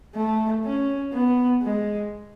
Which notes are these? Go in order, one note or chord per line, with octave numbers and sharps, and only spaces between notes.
A3
C#4
B3
G#3